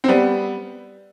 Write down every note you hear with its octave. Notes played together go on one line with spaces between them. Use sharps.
C4
G3 B3